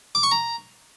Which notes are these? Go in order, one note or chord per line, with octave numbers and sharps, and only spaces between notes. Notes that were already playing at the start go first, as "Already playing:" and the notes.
D6
C#6
A#5